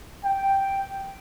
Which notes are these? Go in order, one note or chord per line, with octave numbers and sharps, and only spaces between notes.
G5